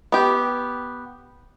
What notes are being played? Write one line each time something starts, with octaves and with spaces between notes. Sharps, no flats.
B3 G4